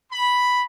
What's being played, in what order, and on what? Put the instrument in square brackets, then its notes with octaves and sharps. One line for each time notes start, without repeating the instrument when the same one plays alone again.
[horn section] B5